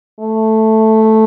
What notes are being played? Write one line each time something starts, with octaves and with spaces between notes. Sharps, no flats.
A3